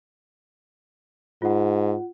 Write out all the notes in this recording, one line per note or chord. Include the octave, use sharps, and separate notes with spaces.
G#2 F4 F#5